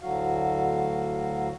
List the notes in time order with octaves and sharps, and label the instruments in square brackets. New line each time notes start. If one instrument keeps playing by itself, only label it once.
[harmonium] D2 A2 D3 F#3 F#4 F5